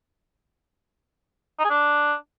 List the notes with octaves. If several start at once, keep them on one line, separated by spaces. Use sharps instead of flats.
D#4
G#4
D4